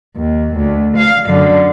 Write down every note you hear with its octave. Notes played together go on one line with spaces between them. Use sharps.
D#2
D2
F5
F#2 D3